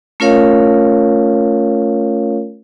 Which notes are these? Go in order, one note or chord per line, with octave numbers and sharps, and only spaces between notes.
A3 C#4 F4 A#4 C#5 F5